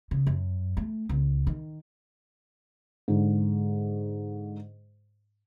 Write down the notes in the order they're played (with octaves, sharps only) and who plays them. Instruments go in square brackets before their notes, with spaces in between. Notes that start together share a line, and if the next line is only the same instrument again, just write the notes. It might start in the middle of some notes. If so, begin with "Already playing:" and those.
[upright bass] C#3
F#2
A3
C#2
D#3
[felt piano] G#2 D3